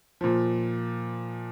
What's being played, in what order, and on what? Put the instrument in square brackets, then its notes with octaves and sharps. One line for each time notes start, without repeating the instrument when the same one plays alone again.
[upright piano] A#2 F3